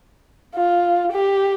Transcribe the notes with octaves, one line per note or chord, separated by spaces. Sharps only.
F4
G4